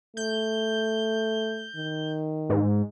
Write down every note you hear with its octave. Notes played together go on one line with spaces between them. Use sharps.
A3 G6
D#3
G#2